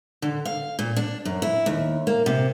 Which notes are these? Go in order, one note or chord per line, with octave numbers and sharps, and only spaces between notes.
D3
F5
A#2
D4
F#2
E4
D#2
A#3
C3